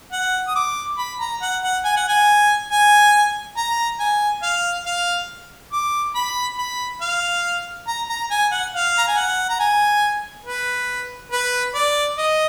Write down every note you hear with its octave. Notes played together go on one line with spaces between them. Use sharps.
F#5
D#6
D6
B5
A#5
F#5
F#5
G#5
F#5
G#5
G#5
A#5
G#5
F5
F5
D6
B5
B5
F5
A#5
A#5
G#5
F#5
F5
A#5
G#5
F#5
A#5
G#5
B4
B4
D5
D#5